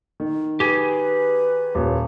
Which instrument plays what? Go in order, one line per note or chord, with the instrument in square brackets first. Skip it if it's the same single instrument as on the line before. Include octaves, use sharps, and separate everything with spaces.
[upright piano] D#3
[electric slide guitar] G4 G#4 [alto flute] B4
[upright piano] D#1